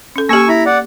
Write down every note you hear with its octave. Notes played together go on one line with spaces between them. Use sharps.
C#4 A4
A#3 G4 G#5 C#6 E6
E4 A#5 B5
D5 F#5